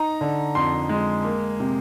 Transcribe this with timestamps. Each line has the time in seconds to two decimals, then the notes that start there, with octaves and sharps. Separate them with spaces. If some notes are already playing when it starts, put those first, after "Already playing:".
Already playing: D#4 A#5
0.21 D3
0.55 F2 C6
0.89 G#3
1.24 A#3
1.60 C3